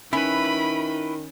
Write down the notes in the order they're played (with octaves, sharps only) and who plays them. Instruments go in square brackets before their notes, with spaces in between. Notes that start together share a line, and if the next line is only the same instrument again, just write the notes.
[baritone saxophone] D#3 [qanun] C#4 [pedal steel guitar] E4 B4 [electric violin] B5